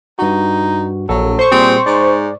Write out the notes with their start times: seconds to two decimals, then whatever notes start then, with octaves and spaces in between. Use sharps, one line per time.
0.19 G2 D#4 F#4
1.09 A#1 F#3 A4
1.38 C5 C#6
1.52 A#2 G3 C4 G#4
1.86 G#2 D5